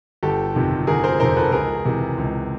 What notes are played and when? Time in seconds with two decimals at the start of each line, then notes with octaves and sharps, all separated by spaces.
0.23 G1 G4 A4
0.55 F2 C3 D#3
0.87 G1 G#4 A#4
1.04 A#4 C5
1.20 F2 C3 D#3 A#4 C5
1.37 A4 B4
1.52 C#2 G#4 A#4
1.85 C3 E3
2.18 C#2